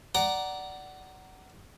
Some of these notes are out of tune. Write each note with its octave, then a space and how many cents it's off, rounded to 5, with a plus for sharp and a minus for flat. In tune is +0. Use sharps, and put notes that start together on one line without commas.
D5 +0 F#5 +20 A#5 +0